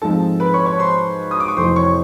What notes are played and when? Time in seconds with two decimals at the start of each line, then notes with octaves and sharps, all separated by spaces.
0.02 G#2 F3 G#3 C4 A4 A5
0.40 B4 B5
0.53 C#5 C#6
0.66 C#5 C#6
0.79 C5 C6
1.31 D#6
1.40 D6
1.48 C#6
1.57 F2 C3 E3 A3 C5 C6
1.76 C#5 C#6